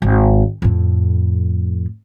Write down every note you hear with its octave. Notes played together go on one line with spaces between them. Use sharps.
G#1
F2 A2